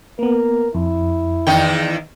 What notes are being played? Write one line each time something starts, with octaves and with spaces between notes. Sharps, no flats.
A#3 B3 A#4
F2 E4
E2 D#3 D#4 G5